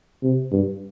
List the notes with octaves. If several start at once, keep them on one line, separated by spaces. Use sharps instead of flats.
C3
G2